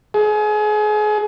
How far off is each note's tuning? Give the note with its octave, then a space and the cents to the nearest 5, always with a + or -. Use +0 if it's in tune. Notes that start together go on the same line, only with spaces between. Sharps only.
G#4 +30